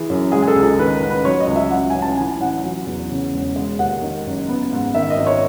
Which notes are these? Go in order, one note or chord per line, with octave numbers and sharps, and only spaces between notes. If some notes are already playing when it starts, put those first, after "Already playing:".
Already playing: E3 G#4
F#2
G#3 G#4
G#4
A4
C#2
A4
D#3 B4
B4
A1
B4
F#3 C#5
D#5
C#2
E5
F#3 F#5
A1 G#5
A5
E3 G#5
G#5
A1 F#5
F#3
E2
C#3
E1
G#3
D#2 F#5
D#3
F#1
B3
G#2
D#3 E5
D#5
G#1
C#5